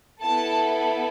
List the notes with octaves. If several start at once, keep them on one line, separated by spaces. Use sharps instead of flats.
B3 E4 A4 A5